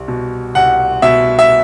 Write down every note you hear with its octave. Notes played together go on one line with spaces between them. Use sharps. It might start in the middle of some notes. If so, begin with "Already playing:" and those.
Already playing: C2
B2
C2 F#5
B2 E5
E5